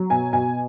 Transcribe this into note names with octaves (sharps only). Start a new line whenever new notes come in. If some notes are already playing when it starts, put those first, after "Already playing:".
Already playing: F#3
B2 G#5
B2 G#5